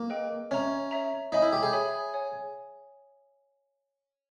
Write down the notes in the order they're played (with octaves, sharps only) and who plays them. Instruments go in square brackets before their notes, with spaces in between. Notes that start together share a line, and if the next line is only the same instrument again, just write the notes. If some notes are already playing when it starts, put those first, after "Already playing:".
Already playing: [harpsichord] A#3
[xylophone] G#4 B4 D#5 G5
[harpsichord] C#4 [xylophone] C#5 E5 A#5
[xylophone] C#5 E5 A#5
[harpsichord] D#4 [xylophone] C#5 E5 G#5 B5 D#6
[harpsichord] E4
G4
G#4
[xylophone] C#5 E5 G#5 B5 D#6
C#5 G#5